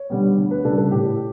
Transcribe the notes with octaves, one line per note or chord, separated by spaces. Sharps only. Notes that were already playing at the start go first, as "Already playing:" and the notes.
Already playing: C#5
D3 G3 B3
D2
B4
C#3 G3 D4 A4
A4
A2 G4